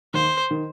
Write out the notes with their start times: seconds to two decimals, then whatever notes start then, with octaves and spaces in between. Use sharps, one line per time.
0.14 D#2 D#3 C5
0.51 D#3